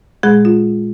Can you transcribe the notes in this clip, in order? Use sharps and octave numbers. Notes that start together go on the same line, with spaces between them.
A#2 G#3 G#4
F4